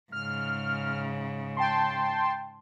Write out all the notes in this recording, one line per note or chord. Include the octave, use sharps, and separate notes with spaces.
G#2 C#3 F6
G5 A5 C6